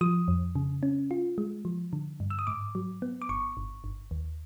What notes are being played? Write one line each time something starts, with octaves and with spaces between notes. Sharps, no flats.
F3 D#6
F2
C#3
C#4
F4
G#3
F3
D3
G2
E6
D#6
G#2 D6
F#3
B3
D6
G1 C#6
G1
G1
D#2